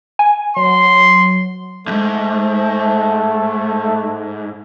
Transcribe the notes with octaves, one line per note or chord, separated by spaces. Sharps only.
G#5
F#3 C6
E2 G#2 A3